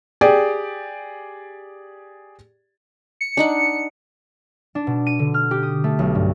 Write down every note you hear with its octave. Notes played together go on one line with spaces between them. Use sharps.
G4 G#4 D5
C#7
D4 D#4 F#5
D4
B2
D#7
D3
F6
G4
D#6
A3
B1
G2